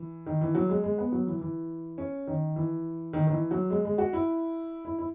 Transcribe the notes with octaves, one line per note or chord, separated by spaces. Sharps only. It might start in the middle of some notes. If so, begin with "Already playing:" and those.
Already playing: E3
D#3
E3
F#3
G#3
G#3
B3
F#3
E3
E3
C#4
D#3
E3
D#3
D#3
E3
F#3
G#3
G#3
F#4
E4
E4
E4